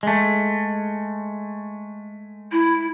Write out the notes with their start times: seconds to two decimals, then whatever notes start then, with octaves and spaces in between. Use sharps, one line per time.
0.03 G#3 A3
2.52 E4